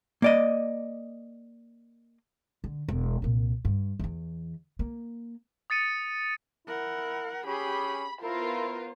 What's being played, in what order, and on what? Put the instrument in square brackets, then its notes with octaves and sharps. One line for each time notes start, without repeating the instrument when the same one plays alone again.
[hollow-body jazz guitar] A#3 D5 D#5
[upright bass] D3
E1
C2 A#2
G2
E2 E3
A#3
[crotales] D#6 A6 C#7 D#7
[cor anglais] E4 [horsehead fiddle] A#4 F#5
[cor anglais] C#4 [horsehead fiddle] G4 G#4 [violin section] B5
[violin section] B3 F4 A#4 [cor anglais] E4 [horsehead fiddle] C5